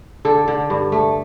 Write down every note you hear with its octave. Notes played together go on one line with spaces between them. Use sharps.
D3 A4
D3
G2
A3